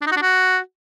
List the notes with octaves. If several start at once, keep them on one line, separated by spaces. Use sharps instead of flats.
D4
D#4
F#4
D4
F#4